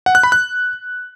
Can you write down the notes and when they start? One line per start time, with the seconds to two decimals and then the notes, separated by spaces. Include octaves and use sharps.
0.06 F#5
0.15 F#6
0.23 B5
0.32 F#6